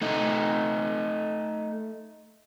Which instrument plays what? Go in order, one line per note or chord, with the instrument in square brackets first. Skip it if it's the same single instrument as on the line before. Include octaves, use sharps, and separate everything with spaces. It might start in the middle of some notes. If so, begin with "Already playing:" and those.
[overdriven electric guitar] A3 D#4